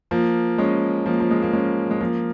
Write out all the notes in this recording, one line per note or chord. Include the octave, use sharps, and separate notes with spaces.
F3 A#3
G#3 C#4
F3 A#3
F3
G#3
A#3
G#3 C#4
G#3
F3 A#3